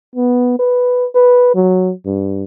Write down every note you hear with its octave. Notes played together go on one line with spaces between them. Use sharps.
B3
B4
B4
F#3
G2